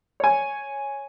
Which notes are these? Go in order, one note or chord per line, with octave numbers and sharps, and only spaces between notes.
C#5 G#5